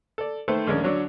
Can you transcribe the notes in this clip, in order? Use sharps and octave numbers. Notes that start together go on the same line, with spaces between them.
A4 D5
D#3 A3 A4 B4 C5
A#1 D#2 G#3 C#4 A#4 D5
D3 F#3 D4 C#5